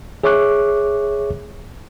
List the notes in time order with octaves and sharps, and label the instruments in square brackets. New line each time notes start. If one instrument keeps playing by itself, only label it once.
[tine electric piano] G#4 C#5 E5 C#6 D6 F#6